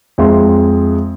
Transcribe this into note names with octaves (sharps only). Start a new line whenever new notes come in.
F2 G#3 E5 C6